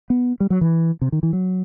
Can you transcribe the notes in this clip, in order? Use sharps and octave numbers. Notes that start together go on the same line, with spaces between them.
B3
G3
F#3
E3
C3
D#3
E3
F#3